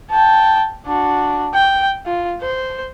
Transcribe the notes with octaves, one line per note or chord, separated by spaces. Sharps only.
G5 A5
D4 F#4
G5
F4
C5